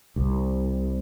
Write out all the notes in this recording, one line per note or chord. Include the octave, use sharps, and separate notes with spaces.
C2